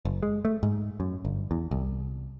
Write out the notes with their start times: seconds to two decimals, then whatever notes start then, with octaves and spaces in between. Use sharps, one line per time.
0.05 F#1
0.23 G#3
0.45 A3
0.63 G#2
1.00 F#2
1.25 G1
1.51 E2
1.71 C2